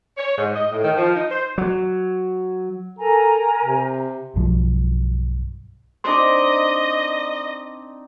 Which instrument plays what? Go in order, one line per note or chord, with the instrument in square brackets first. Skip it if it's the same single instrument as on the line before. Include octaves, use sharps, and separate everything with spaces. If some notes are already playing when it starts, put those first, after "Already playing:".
[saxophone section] C#5
G#2
D#5
A2
D#3
F3
D#4
C5
[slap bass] F#3
[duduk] A4 [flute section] A#4 G#5 A#5
[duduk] C3
[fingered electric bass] B1 G2 F3 F#3
[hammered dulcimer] C4 D4 D#4 [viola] D#5 [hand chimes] C6 D6